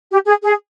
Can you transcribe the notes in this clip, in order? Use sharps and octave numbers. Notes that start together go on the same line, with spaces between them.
G4
G#4
G#4